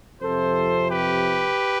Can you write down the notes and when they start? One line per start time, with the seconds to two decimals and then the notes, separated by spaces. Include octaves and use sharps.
0.21 F2 C3 F3 A4 C5
0.89 G4 B4